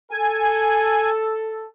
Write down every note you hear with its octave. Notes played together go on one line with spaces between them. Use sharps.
A4 G#5